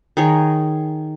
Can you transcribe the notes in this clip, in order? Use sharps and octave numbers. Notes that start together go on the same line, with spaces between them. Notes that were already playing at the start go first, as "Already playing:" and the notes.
D#3 G#4 A#4 C#5